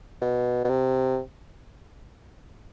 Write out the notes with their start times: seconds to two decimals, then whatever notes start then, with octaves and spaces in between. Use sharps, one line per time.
0.22 B2
0.65 B2
0.69 C3